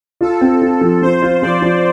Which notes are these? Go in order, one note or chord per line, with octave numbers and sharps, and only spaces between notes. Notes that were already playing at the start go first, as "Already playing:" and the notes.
F4 A4
C4
F4
F3
F3 C5
F4
F3 D5
F3